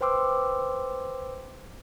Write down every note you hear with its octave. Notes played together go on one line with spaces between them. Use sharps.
B4 C5 G5 C6 D6 E6